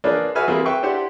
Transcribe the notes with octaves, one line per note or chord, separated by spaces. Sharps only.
A#3 D4 F4 G#4 B4 D5
F#4 G#4 B4 E5 G#5 F6
G3 A#3 C4 E4 G#4
B4 E5 G5 C#6
D4 E4 G4 C5 F#5